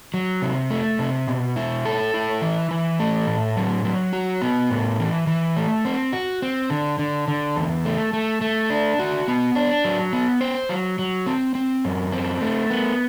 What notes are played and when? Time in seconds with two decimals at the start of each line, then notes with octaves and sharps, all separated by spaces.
0.14 F#3
0.42 C3
0.70 A3
0.99 C3
1.28 B2
1.56 E4
1.85 A4
2.14 E4
2.41 E3
2.71 E3
3.00 A3
3.27 A2
3.56 F#3
3.85 F#3
4.13 F#4
4.42 B3
4.70 A2
4.99 E3
5.27 E3
5.57 A3
5.85 C4
6.13 F#4
6.42 C4
6.70 D3
6.99 D3
7.28 D3
7.56 E2
7.85 A3
8.13 A3
8.41 A3
8.70 D4
8.99 F#4
9.28 B3
9.55 D4
9.84 F#3
10.13 B3
10.41 C5
10.69 F#3
10.99 F#3
11.26 C4
11.55 C4
11.85 F#2
12.12 C4
12.41 A3
12.70 B3